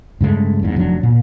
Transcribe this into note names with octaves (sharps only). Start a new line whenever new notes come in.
G2 C#3 G#3 A3
E2 G#2
F1 F#3 D4
A#2